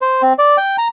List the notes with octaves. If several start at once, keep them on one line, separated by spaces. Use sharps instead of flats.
C5
C4
D5
G5
A#5